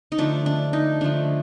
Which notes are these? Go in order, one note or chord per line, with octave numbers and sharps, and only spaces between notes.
D#4
D3 F3 A3 D4
D4
D#4
D3 F3 A3 D4